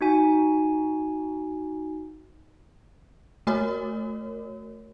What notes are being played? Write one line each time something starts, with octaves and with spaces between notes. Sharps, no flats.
D#4 F#4 G#5
A3 F#4 A#4 C#5